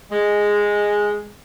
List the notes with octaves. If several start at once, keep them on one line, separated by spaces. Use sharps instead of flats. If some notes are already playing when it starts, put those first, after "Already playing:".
G#3